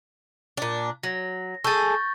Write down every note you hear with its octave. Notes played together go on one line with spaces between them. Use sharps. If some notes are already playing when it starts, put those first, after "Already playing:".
A#2 D4
F#3 A#6
G#4 A4 C#6 G6 A6